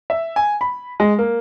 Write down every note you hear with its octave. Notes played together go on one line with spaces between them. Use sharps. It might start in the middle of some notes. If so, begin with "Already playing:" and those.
E5
G#5
B5
G#3
A#3